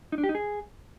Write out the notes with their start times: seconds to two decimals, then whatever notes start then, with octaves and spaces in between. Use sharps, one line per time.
0.12 D#4
0.18 D4
0.24 G4
0.29 D#4
0.35 G#4